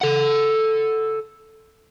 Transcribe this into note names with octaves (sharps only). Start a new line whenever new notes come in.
A4 F#5